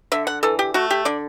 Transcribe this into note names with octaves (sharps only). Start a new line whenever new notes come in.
D3 E5
F#5
E3 A4
G4
A3 F#4
G4
D3 D5